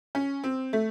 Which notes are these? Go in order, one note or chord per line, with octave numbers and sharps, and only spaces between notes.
C#4
C4
A3